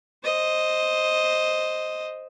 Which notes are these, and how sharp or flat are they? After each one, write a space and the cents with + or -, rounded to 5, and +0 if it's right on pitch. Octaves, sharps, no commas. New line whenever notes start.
C5 +0 D#5 +0